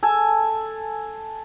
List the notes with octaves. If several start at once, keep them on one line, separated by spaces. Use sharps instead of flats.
A4 G#5